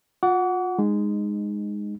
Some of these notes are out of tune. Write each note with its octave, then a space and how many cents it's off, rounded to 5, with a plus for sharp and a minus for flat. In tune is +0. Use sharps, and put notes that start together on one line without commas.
F4 +35 F#5 +0 D6 -45
G#3 -10 D#4 -20